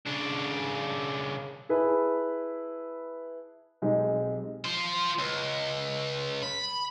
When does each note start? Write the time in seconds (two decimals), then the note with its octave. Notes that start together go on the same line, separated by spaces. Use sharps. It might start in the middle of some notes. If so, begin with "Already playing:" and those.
0.07 C#3 D4
1.69 E4 G#4 B4 A5 B5
3.82 B1 G#3 C4 D#4 G4
4.65 F4 C5
5.19 C#2
6.43 B5